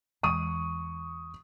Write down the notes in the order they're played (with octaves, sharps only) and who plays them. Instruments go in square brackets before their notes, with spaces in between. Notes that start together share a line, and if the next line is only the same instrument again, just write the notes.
[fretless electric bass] E2 E3 G#3 [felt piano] C#6 D#6 D#7